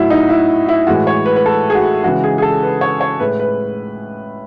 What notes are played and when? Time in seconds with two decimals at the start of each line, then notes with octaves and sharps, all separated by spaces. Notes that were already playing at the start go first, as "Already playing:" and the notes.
Already playing: A2 F#3 E4 F#4
0.10 D#4
0.30 E4
0.69 E4
0.87 A2 E3 G#3 F#4
1.07 C#5
1.26 B4
1.36 B4
1.46 A4
1.70 G#4
1.75 F#4
2.03 C#3 E3 G#3 F#4
2.24 G#4
2.38 G#4
2.42 A4
2.62 B4
2.81 C#5
3.01 C#5
3.20 A2 G#3 B4
3.39 B4